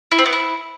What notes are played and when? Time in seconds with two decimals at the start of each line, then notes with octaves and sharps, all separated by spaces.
0.12 E4
0.19 C4
0.26 B3
0.33 E4